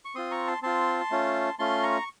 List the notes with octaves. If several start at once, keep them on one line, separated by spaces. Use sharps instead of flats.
C#6
C4 F4 C6 D#6
A#5 C#6
A5 C6
C4 F4 A5 C6
A3 C#4 F4
A3 C#4 F4 A5 C6
A#5 C#6